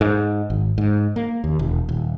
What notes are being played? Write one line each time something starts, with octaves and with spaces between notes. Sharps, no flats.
G#2
G#1
G#2
A#3
D#2
E1
D#1